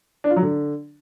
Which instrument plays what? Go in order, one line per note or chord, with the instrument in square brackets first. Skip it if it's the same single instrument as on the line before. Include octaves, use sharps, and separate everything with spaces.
[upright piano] D4
F4
F#3
D3